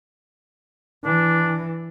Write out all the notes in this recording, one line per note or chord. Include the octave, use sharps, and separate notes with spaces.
E3 D4